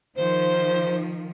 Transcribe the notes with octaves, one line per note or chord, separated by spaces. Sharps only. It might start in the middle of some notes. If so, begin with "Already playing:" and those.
D#3 F3 C5